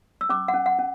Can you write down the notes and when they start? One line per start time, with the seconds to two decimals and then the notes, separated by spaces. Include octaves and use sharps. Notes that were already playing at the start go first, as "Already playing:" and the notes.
0.21 E6
0.29 C#4 D6
0.48 F#5
0.54 C#4
0.66 F#5
0.79 C#4